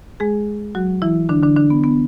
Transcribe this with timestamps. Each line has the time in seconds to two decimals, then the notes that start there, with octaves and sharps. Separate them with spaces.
0.20 G#3 G#4
0.75 F#3 F#4
1.02 E3 E4
1.29 D3 D4
1.42 D3 D4
1.56 D3 D4
1.70 B3
1.84 B3